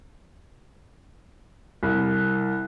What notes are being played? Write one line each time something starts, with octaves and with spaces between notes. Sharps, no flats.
C2